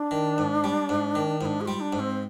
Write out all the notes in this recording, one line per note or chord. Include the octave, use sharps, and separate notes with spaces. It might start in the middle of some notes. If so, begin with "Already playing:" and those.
Already playing: D4
D#3
G#2
G3
G#2
D#3
G#2 D4 F4
G#4
G3 F4
D4
G#2
C4